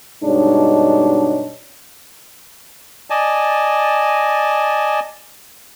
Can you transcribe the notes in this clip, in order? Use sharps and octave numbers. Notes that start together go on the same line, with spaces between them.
G2 B2 G#3 D4 D#4 C#5
D5 D#5 G#5 A5